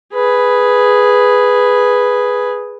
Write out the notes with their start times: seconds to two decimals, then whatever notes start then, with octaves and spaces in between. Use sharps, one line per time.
0.13 G#4 B4